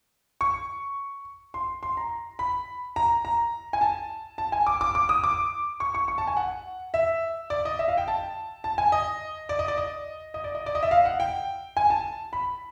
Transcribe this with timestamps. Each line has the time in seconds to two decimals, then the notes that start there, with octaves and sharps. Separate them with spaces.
0.41 C#6
1.54 C6
1.83 C6
1.97 A#5
2.39 B5
2.96 A#5
3.25 A#5
3.73 G#5
3.81 A5
4.38 A5
4.52 G#5
4.67 D6
4.81 D6
4.95 D6
5.09 D#6
5.24 D6
5.80 C#6
5.94 C#6
6.08 C#6
6.18 A5
6.27 G#5
6.37 F#5
6.94 E5
7.50 D5
7.65 D#5
7.79 E5
7.88 F5
7.98 G5
8.08 A5
8.64 A5
8.78 G#5
8.92 D#5
9.49 D5
9.59 D#5
9.68 D5
9.77 D#5
10.34 D#5
10.44 D5
10.55 D#5
10.66 D5
10.75 D#5
10.83 E5
10.91 F5
11.05 F#5
11.20 G5
11.77 G#5
11.90 A5
12.33 B5